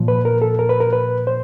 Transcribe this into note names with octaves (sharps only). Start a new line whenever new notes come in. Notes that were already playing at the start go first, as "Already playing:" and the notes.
Already playing: A#2 F3
B4
A#4
A4
A#4
B4
A#4
B4
C5